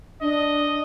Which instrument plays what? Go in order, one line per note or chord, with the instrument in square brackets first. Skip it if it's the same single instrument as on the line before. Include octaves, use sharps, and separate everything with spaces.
[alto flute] D4 [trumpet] D#5